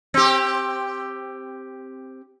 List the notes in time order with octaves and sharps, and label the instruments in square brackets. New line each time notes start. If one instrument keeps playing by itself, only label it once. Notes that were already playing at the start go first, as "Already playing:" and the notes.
[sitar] C4 G4